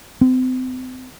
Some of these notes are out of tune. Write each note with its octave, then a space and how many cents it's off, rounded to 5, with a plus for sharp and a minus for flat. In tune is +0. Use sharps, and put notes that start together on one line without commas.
C4 -35